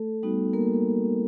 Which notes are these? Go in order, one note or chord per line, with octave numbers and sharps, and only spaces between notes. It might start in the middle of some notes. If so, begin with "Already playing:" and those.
Already playing: A3 A4
G3 B3 D#4 F#4
A#3 A#4